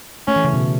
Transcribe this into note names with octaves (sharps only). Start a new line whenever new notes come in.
A3 C#4
E3
C#3
B2
C#3